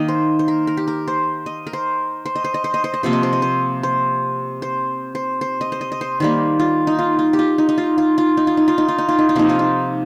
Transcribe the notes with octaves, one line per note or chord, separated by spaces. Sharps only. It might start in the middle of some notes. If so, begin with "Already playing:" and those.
Already playing: D#3 A#3 D#5
C5
C5
A#4
A#4
G4
A#4
C5
D#5
A#4
C5
C5
D#5
C5
D#5
C5
D#5
C5
D#5
C3 F3 A#3 C5
D#5
C5
D#5
C5
C5
C5
C5
C5
D#5
C5
D#5
D#5
C5
D#3 G3 A#3 C5
F4
D#4
F4
F4
G4
F4
D#4
D#4
F4
F4
F4
D#4
F4
D#4
F4
D#4
F4
D#4
F4
D#4
F4
C3 F3 A#3 D#4
F4
D#4